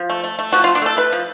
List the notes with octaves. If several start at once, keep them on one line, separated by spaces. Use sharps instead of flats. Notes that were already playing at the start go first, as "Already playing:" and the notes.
Already playing: F3
A3
A3
A3
F3 F#4
A3 F4
D4
A3 A4
A3 B4
F3